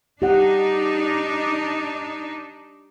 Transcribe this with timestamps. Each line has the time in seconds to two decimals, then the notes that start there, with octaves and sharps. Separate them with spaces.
0.22 D4 D#4 G4 F#5